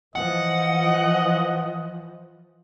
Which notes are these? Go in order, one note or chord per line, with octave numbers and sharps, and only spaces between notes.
E3 F3 D#5 F#5